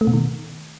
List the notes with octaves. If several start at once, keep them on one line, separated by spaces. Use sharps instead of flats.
A3
B2
D#3